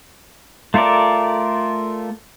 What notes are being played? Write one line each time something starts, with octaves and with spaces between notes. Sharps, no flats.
A3 F4 A4 A#4 D5